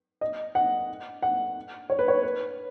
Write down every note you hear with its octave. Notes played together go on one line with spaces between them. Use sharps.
D#5
F#5
F#5
C#5
B4
C#5
B4